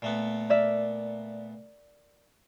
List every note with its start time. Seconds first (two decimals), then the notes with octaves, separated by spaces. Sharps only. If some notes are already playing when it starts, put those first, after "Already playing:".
0.02 A#2 A3 B3
0.50 A#4 D5 E5